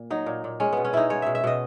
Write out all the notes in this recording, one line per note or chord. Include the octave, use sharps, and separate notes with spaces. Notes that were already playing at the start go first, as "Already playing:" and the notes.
Already playing: A#2
F#3 D#4
A#2
A#2
G#3 C#4
B2 B3
C#4
B2 D#4 E4
G#3 C#5
B2 E5
E5
B2 D#5